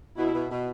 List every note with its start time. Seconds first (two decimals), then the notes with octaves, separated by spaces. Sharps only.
0.17 B2 E4
0.34 B2
0.50 B2